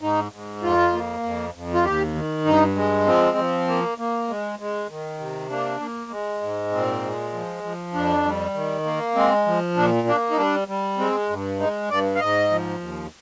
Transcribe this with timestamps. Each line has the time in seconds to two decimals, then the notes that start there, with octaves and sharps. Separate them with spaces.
0.01 G#2 D#4
0.32 G#2
0.63 F2 F4
0.93 A#3
1.24 F2
1.54 F2
1.74 F4
1.84 D#2 G4
2.15 D#3
2.45 G2 D#4
2.76 G#3
3.06 F3 C4
3.37 F3
3.68 A#3
3.98 A#3
4.28 G#3
4.59 G#3
4.89 D#3
5.19 C3
5.50 A#3 D4
5.80 A#3
6.11 G#3
6.42 G#2
6.72 A#2 C4
7.02 G#3
7.33 F3
7.63 F3
7.94 F2 D4
8.25 G3
8.54 D#3
8.85 A#3
9.15 G#3 C4
9.46 F3
9.77 A#2 D4
10.07 A#3 D4
10.31 D#4
10.37 G3 D4
10.68 G3
10.98 G#3 C4
11.29 G2
11.60 G#3 D#4
11.90 G2 D5
12.15 F5
12.20 G#2 D#5
12.51 F3
12.81 D#2